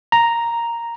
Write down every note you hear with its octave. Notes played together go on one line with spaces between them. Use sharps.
A#5